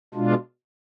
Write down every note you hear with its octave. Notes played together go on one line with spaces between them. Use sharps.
B2 G#3 D4 F4